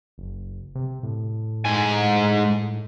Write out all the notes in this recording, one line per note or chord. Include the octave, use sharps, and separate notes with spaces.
F#1
C3
A2
G#2 G#5